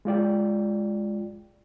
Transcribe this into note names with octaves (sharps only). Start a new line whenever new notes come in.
G#3 F4 D5 G5